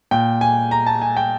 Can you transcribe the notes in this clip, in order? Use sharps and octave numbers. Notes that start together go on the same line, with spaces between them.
A#2 G5
G#5
A#5
A5
G#5
G5